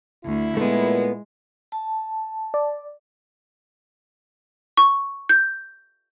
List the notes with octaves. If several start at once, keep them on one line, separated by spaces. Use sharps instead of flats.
D2 E4
A#2 G#3 A3 B3 B4
A5
D5
C#6
G6